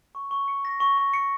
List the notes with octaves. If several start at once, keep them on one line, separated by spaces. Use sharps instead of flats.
C#6
C#6
C#7
A#6
C#6
C#6
C#7